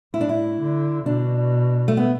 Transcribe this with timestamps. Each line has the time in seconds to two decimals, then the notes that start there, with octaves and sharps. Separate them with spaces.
0.14 A2 E4
0.21 D4
0.29 E4
0.60 D3
1.05 B2 D4
1.88 A3
1.97 B3